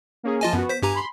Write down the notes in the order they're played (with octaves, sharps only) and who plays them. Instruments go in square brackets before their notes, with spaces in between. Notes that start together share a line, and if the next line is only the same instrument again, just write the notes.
[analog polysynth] A#3 C#4 G#4
[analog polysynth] F3 A5 [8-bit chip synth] F4 D#5 G#5
[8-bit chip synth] F#2 [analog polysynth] B3 F#4
[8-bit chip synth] C5 B6
[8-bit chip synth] G2 G4 A#5 [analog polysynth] G#5
[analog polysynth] B5 C6